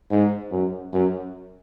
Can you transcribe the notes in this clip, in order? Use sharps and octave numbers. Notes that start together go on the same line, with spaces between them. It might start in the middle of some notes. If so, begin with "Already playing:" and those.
G#2
F#2
F#2